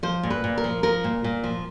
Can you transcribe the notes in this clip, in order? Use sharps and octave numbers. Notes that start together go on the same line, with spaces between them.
F3 C5
A#2
B4
A#2
A#4
F3
F3 A#4
A#2
A#2
F3